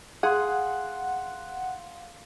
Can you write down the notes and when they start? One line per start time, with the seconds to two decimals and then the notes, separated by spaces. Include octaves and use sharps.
0.23 G#4 F5 F#5 C6